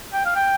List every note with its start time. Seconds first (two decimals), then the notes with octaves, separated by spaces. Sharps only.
0.13 G5
0.25 F5
0.36 G5